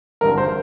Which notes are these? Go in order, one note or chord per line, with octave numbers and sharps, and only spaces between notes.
G#1 G2 D3 A#4
C5